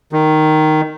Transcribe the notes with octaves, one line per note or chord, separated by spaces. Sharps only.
D#3